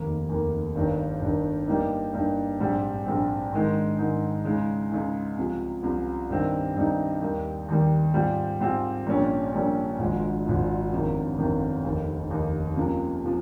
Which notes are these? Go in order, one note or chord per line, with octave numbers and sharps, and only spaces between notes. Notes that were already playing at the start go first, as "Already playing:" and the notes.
Already playing: F1 D#2 D#3 A#3
F1 D#2 D#3 A#3
G1 G2 D#3
G1 G2 D#3
G2 G3 A#3 D#4
G2 G3 A#3 D#4
A#1 G#2 G3 C4
A#1 G#2 G3 C4
G#2 D#3 G#3 D#4
G#2 D#3 G#3 D#4
C#2 C#3 G#3 D#4
C#2 C#3 G#3 D#4
C2 C3 F3
C2 C3 F3
G2 D#3 G3 C4 D#4
G2 D#3 G3 C4 D#4
D#2 D#3 G3
D#2 D#3 G3
G#2 G3 C4 F4
G#2 G3 C4 F4
A#1 A#2 G3 C#4
A#1 A#2 G3 C#4
G#1 G#2 F3 G#3
G#1 G#2 F3 G#3
G1 F2 C3 D#3
G1 F2 C3 D#3
F1 D#2 D#3
F1 D#2 D#3
C#2 C3 F3 A#3
C3 F3